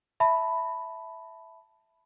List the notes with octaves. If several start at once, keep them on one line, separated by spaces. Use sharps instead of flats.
E5 A5 B5